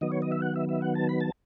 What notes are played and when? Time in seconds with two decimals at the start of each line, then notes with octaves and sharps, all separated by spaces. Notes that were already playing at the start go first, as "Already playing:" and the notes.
0.01 D#3 F#3 B3 D#5
0.12 C#5
0.22 D#5
0.32 E5
0.42 F#5
0.56 E5
0.69 E5
0.82 F#5
0.95 A5
1.09 B5
1.21 A5